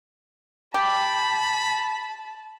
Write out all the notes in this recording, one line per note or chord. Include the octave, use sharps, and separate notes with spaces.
G4 A5 B5